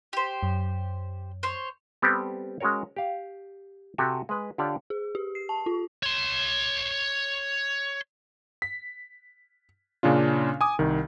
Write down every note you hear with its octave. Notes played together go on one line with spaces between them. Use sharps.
G4 C5
F#2
C5 C#5
G3 B3 C4 G4 A4
G#3 C#4 F#4 A#4 C#5
G4 F5
C3 F#4 G4 A4 G#5
G#3 B4
D3 F4 G4 C#5 D5
G#4
G4
C7
A5
F4
C#5 C6
B6
A#2 C#3 C#4 D4 F4
G#5 D6 D#6
C2 D#3